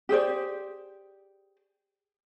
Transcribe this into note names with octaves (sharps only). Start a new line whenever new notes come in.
G4 G#4 C5 D5